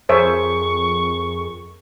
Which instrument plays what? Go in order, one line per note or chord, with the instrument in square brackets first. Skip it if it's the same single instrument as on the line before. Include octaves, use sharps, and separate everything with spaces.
[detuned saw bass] F2 [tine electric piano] G#4 A#4 [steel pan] C5 C#5 E5 [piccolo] C#6